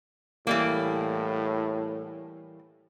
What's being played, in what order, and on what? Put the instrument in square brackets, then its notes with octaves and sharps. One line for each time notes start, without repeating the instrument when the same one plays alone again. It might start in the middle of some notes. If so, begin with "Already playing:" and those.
[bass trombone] A2 [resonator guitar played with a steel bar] E3 G3 A#3